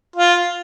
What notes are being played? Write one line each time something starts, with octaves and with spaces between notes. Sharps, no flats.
F4